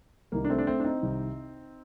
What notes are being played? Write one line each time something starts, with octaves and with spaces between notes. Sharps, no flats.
C2 C3 D#3 A#3
D4
A3 C4
D4
A3 C4
D4
C4 D#4
C2 C3 D#3